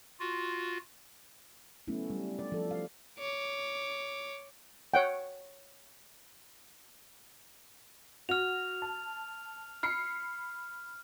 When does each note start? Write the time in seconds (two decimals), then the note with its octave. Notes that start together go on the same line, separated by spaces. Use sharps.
0.20 F4 F#4
1.88 F#3 A3 B3 C#4 E4
2.10 G3
2.39 D5
2.52 F3 A4
2.71 F5
3.19 C#5 D6
4.94 C#5 F#5 G5
8.29 F#4 F6 F7
8.82 A5
9.83 B5 F6 C7 C#7